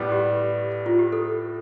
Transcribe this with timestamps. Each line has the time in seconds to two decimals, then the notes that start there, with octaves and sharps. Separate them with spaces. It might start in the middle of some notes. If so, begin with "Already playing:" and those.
Already playing: A2 G3 B3
0.12 G4
0.86 F4
0.99 G4
1.12 A4